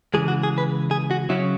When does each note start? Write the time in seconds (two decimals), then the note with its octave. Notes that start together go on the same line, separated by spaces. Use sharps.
0.14 C#3 E3 G#3 G#4
0.28 F#4
0.43 G#4
0.58 B4
0.91 G#4
1.11 F#4
1.29 C#3 F#3 C#4 E4